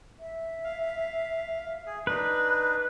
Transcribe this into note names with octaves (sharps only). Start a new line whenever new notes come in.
E5
F5
G#4
D4 D#4 B4